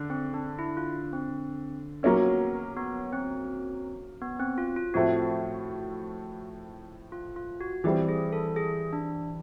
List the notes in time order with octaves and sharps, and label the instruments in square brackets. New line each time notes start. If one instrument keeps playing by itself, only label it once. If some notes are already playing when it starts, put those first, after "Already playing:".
Already playing: [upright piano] D3
[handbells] C4
D4
E4
F4
C4
[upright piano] F#3 A#3 C#4 [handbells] B3
[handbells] B3
C4
B3
C4
F4
F4
[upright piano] A2 F3 A3 C4 [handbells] F#4
[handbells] F4
F4
F#4
[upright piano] E3 G3 C4 [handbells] G4
[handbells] G#4
A4
G#4
D4